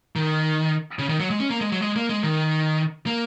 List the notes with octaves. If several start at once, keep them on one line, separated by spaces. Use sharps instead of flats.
D#3
C#3
D#3
F#3
G#3
C#4
A#3
G#3
F#3
G#3
A#3
G#3
D#3
A#3